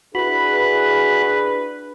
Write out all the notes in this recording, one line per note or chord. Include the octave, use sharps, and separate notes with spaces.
D4 E4 F#4 G#4 B4 B5